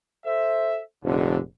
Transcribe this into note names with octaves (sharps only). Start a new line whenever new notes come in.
A4 C5 E5
F1 A#1 D3